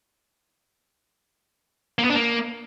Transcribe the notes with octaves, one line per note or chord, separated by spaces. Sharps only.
A#3
B3
D4
A#3